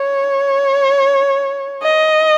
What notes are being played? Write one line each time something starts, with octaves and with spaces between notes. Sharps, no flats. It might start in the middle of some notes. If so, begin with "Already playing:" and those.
Already playing: C#5
D#5